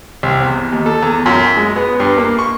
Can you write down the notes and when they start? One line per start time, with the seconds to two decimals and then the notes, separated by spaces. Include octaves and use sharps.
0.23 C2
0.42 E2
0.72 D#2
0.86 A4
1.03 E2
1.26 F#2
1.57 G#3
1.76 B3
2.00 G2
2.18 A#3
2.39 C#6